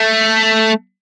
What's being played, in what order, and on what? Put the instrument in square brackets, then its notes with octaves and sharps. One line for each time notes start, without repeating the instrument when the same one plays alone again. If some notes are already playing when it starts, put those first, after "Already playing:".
Already playing: [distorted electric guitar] A3